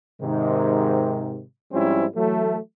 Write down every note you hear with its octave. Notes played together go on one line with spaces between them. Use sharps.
G#2 C3 D#3
G#2 F3 G3 C4 C#4 E4
E3 F#3 A3